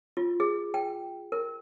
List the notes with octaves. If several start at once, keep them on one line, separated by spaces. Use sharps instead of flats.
F4
G#4
G5
A#4